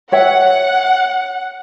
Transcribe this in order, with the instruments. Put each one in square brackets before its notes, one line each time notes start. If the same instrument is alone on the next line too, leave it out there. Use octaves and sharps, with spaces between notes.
[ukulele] C#5 E5 G5 [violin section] F#5